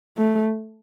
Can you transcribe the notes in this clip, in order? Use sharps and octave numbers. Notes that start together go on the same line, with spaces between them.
A3